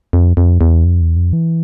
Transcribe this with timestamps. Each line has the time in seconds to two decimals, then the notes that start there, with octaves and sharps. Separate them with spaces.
0.13 F2
0.37 F2
0.61 E2
0.85 F2
1.01 E2
1.17 F2
1.33 E3